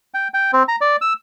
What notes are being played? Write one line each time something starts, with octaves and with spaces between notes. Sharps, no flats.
G5
G5
C4
A#5
D5
E6